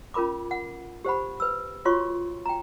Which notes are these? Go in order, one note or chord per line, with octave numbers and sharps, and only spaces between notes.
C#4 F4 A#4 B5 D6
F#5
G4 C5 F#5 B5
B4 E6
F4 F#4 C#5 C6 C#6
G5 A#5